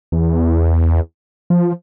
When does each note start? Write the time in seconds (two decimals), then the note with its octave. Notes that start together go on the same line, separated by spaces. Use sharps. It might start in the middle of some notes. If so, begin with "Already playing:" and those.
0.12 E2
1.50 F3